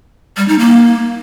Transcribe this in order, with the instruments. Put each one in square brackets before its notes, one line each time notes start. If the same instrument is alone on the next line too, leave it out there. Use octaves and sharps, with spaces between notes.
[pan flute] G3
D#4
A#3